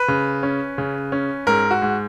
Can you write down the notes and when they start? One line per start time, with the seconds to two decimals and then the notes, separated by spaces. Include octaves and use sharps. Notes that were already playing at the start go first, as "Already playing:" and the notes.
Already playing: B4
0.08 C#3
0.43 C#4
0.78 C#3
1.12 C#4
1.47 G#2 A#4
1.71 F#4
1.82 G#2